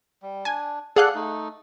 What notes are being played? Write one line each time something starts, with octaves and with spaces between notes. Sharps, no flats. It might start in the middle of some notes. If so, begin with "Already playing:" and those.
G3
D4 G#5
G#4 A4 D5 F5 F#5 F#6
A3 D#4